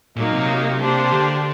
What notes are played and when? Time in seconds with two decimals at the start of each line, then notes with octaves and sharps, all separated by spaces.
0.16 A#2 F#3 A#3 D#4
0.32 C3
0.80 A#3 D4 G4 C5
1.12 D3